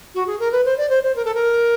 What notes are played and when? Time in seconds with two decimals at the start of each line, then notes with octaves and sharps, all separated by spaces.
0.15 F#4
0.27 G#4
0.39 A#4
0.52 B4
0.65 C5
0.78 D5
0.90 C5
1.03 C5
1.16 A#4
1.25 A4
1.35 A#4